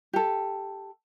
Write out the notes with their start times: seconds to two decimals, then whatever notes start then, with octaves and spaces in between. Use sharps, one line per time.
0.13 G4 A4